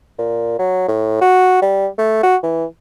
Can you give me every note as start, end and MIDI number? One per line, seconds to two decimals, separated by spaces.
0.19 0.55 46
0.59 0.85 54
0.88 1.20 45
1.21 1.59 66
1.62 1.87 55
1.98 2.21 57
2.23 2.37 66
2.43 2.65 52